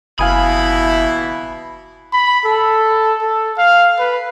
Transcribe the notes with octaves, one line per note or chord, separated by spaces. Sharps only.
F#1 B2 E3 E4 F5 G#5 B5 D#6
B5
A4
A4
F5
B4